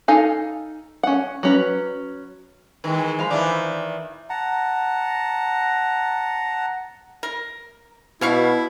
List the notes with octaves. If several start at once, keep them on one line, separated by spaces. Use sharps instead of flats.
D#4 A4 F5 G#5
C#4 F#5
F#3 C#4 B4
D#3 E3 G#3
F3 G#3 F5 B5
D#3 E3 D4 E5 D6
F#5 A5 A#5
A#4
B2 B3 E4 F5 C#6